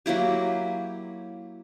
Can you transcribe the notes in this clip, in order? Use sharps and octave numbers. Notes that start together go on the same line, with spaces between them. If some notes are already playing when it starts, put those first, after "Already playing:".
F#3 A#3 E4 G4